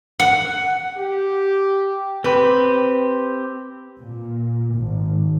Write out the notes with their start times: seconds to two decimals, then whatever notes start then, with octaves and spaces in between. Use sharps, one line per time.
0.20 F#5
0.97 G4
2.24 C4 G4 B4
3.97 A#2
4.75 G#1